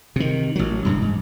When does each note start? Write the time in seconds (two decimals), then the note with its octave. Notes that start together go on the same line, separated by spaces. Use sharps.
0.16 C3 D#3
0.56 A1 F#3
0.85 E1 G2 C#3
1.02 G#2